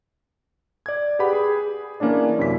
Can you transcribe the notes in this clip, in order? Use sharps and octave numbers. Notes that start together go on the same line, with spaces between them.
D5 G#6
G4 G#4 B4 F#5 B5
G#4
E3 A#3 C#4 D4 D5
F#2 C3 E4 B6